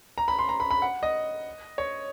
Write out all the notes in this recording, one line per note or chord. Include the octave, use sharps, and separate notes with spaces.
A#5
B5
C6
A#5
B5
B5
F#5
D#5
C#5